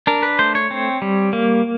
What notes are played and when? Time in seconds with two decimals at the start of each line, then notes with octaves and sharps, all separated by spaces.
0.07 D4 A#4
0.23 B4
0.39 A3 C5
0.55 C#5
0.71 C4
1.02 G3
1.33 A#3